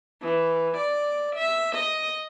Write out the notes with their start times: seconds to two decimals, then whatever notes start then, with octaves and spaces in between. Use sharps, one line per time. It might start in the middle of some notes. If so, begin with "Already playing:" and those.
0.22 E3
0.77 D5
1.36 E5
1.75 D#5